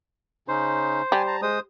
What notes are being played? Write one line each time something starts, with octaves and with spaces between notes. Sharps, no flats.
C#3 C#4 D#4 C5
G3 G#5 A5
A5 A#5
G#3 C5 D#6